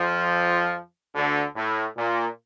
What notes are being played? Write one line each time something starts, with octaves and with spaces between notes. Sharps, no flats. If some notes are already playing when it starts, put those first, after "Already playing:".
Already playing: F2 F3
D2 D3
A2
A#2